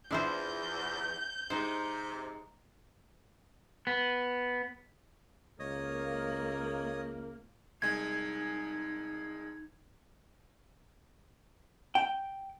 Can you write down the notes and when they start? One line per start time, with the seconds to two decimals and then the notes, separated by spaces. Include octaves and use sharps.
0.11 E2 F3 D4 E4 C5 G6
1.50 C3 G#3 D#4 C5
3.87 B3
5.60 C#2 A#3 C#5 D#5 D#6
7.82 C2 G#3 D#4 G#5 G#6
11.95 G5